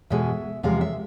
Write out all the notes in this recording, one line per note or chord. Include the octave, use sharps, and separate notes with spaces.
E2 B2 G#3 E5
E2 C3 F3 G#3 F5
E5